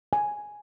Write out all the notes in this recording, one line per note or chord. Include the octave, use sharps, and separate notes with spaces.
G#5